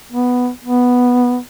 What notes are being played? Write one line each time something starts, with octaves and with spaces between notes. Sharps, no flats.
B3
B3